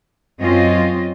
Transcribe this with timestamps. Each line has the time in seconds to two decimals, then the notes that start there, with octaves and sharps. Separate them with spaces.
0.40 F#2 C4 C#4 F4 D#5